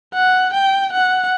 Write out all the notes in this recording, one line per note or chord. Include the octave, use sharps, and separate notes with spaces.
F#5
G5
F#5